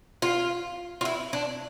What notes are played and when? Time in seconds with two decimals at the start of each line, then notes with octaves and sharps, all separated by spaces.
0.22 F4
1.01 F4
1.05 E4
1.33 D4